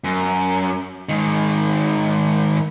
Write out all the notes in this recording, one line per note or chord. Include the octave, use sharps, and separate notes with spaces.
F#2
G#2 D#3